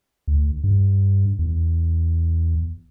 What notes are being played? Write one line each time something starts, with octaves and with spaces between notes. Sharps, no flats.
D2
G2
E2